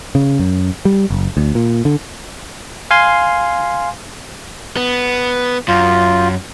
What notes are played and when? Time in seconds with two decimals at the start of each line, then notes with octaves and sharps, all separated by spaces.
0.15 C#3
0.40 F#2
0.85 G3
1.10 F#1
1.37 D2
1.55 A#2
1.85 D3
2.91 F5 G#5 C6
4.77 B3
5.68 F#2 F4